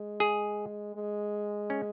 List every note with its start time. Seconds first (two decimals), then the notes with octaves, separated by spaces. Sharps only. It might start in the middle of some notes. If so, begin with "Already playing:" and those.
Already playing: G#3
0.20 G#4
0.95 G#3
1.70 C#4